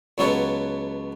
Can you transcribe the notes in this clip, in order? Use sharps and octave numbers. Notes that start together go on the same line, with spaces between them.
C#2 F#3 B3 A4 C#5